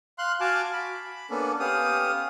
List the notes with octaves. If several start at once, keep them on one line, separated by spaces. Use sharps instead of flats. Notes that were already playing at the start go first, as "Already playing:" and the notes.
F5 C6 F#6
F#4 F5 G#5 A5 D6
B5
A#3 B3 C#4 D4 A4
B3 C#4 G4 F5 D#6